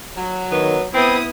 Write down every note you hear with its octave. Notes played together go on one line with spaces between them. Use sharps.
F#3
D#3 B3
B3 C4 E4 B4 D#6